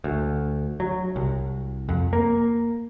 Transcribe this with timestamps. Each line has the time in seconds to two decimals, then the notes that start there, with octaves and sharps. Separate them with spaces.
0.04 D2
0.80 F#3
1.16 C2
1.89 F2
2.13 A#3